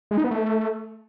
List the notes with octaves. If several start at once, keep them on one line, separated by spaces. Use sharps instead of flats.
G#3
D#4
B3
A3